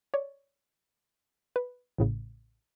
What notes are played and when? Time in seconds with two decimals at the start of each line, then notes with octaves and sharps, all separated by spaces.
0.14 C#5 D5
1.56 B4
1.98 A1 A2 C#3